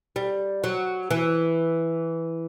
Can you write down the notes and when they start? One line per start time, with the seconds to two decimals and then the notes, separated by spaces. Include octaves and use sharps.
0.16 G3
0.64 F#3
1.11 E3